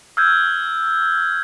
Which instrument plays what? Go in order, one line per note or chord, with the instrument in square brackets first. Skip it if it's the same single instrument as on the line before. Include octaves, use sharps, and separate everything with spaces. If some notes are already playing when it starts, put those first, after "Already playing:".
[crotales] E6 F6 G6 G#6